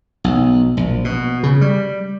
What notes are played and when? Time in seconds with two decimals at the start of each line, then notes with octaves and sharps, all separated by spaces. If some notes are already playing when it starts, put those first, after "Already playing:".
0.24 B1
0.77 A#1
1.04 B2
1.43 C#3
1.61 G3